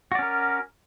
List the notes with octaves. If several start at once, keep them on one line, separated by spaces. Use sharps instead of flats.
C#4 F#4 A#4 D5